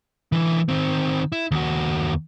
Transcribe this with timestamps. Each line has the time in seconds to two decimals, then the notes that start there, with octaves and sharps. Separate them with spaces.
0.32 D3 E3
0.69 D#3 C4
1.32 E4
1.51 D#2 F#4